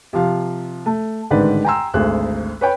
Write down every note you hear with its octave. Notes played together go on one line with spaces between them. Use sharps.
C3 F3 F5
A3
A1 G#2 D3 D#3 B4 D5
G5 G#5 A#5 C6 E6
G#1 D2 G#4 A4 F#6
B4 C#5 G5 B5